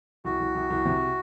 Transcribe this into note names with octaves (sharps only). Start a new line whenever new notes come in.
C2 F#4
C2
C2
C2
C3